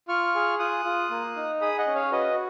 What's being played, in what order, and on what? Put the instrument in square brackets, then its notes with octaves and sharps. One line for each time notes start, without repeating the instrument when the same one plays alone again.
[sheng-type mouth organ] F4 C#6 F6
G#4
F4 D#6 F#6
F4
A#3
D#4
G#4 B5 D#6
D#5 F#5
C#4
C#5 F5
F#4 B4 D#5